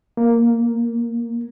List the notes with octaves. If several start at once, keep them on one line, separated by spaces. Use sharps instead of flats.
A#3